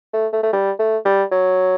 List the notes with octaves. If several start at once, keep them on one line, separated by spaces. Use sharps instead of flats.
A3
A3
A3
G3
A3
G3
F#3